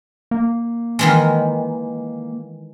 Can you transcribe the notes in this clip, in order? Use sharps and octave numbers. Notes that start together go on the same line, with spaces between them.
A#3
D#3 E3 G#3